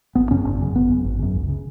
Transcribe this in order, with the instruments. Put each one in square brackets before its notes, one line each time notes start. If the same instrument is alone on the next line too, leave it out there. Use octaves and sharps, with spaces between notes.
[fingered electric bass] G#1 B3
F#2 C#3 C#4
G#1
F#2 C#3
G#1 B3
F#2 C#3
G#1
F#2 C#3
C#2
C#3